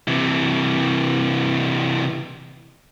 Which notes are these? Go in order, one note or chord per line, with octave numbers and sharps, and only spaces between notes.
C3 E3